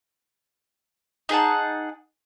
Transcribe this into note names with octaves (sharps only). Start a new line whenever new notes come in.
D#4 G#4 F#5 A5